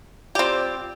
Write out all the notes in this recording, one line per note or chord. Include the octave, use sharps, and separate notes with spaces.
C4 F4 G4 D5